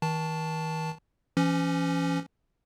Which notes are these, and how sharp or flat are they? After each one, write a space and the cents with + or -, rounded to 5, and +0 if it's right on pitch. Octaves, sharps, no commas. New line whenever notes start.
D#3 +40 A5 +0
E3 +45 C#4 +0